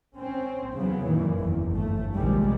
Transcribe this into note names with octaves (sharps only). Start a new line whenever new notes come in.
C4 C#4
E2 C#3 F#3 B3
F#2 A#2 D#3 E3
F#1 E2
G1 A3
A#1 D#2 C3 G3 G#3